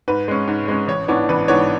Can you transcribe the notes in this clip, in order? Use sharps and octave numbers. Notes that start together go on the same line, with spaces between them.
G#2 B4
G#3 C#4
G#2
G#3 C#4
A1 C#5
G#2 E3 B3 D4 C#5
A1 B4
G#2 E3 B3 D4 C#5